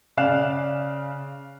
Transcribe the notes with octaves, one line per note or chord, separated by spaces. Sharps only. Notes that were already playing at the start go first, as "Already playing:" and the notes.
C#3 D5 F5 F#6 E7